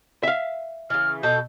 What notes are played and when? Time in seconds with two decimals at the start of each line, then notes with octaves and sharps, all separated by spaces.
0.23 E5 F5
0.90 C#3 E3 F6
1.23 B2 A4 G6